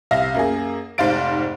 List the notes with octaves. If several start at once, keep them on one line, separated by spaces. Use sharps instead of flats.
C2 E5 F5 A#6
F#2 A#3 G#4
F1 G#2 C5 F5 A6 D7